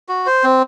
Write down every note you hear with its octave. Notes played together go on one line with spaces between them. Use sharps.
F#4
C5
C4